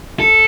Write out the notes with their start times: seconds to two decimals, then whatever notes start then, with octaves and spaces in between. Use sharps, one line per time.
0.20 A4